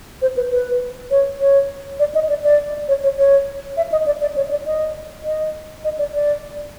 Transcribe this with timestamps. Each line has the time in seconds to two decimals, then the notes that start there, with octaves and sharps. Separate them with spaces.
0.22 C5
0.37 B4
0.51 B4
1.11 C#5
1.40 C#5
2.00 D5
2.15 D#5
2.29 D5
2.44 D5
2.88 C#5
3.03 C#5
3.18 C#5
3.77 E5
3.92 D#5
4.06 D5
4.21 D5
4.36 C#5
4.51 D5
4.66 D#5
5.25 D#5
5.84 D#5
5.99 D5
6.14 D5